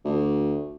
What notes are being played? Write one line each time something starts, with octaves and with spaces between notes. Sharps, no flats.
D2